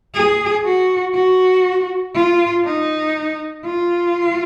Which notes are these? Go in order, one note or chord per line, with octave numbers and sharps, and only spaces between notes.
G#4
F#4
F#4
F4
D#4
F4